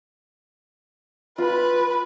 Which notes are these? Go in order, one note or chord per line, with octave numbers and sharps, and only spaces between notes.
F4 B4 B5